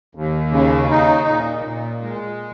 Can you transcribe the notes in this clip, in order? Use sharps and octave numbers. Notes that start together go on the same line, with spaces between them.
D#2
C#3
D#4
A#2
A#2
G#3